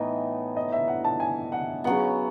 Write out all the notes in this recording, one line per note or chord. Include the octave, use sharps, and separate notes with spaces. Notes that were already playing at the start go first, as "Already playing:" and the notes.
Already playing: A2 E3 B3 D#4
D#5
E5
F#5
A5
G#5
F#5
C#3 F#3 B3 F#5